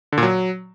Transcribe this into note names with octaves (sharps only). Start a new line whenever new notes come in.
D3
A#2
F#3